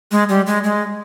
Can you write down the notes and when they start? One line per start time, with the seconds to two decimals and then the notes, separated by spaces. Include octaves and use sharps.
0.11 G#3
0.29 G3
0.46 G#3
0.64 G#3